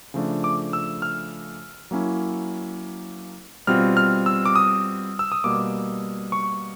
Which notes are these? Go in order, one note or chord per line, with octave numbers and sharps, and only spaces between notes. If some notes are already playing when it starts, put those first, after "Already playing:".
C#3 F3 A3 D4
D6
E6
F6
F#3 A#3 C#4 E4
B2 G3 C4 F4 F6
F6
E6
D6
D#6
E6
D#6
B2 G3 A#3 D6
C#6